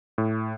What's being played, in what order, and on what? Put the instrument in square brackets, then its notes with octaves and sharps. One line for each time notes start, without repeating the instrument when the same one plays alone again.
[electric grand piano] A2